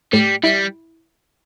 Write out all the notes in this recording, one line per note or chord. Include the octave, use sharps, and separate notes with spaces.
A2 G3
G3 E4